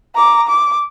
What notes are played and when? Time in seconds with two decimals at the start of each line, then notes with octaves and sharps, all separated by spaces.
0.15 A#5 D6
0.48 D6